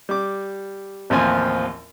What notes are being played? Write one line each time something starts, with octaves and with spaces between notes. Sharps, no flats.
G3 D6
A1 D#2 F3 C4 F4 G#5